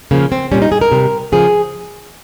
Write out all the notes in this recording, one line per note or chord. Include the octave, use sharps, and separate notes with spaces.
C#3 F3 A#3
C4
A#2 G3 C#4
D#4
G#4
A#4
C3 G3
C#3 F3 G#4